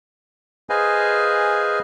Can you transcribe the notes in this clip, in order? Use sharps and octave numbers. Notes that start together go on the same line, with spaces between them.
G#4 B4 C5 D#5 F5 G#5